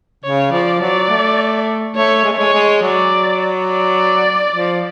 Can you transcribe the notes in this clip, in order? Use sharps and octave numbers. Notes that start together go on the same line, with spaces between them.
C#3 C#5
F3 D5
F#3 D5
A3
A3 C#5
G#3
A3
G#3 C#5
G#3
F#3 D5
D5
F3